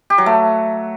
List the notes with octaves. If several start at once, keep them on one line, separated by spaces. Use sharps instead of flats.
G4
F#3
A3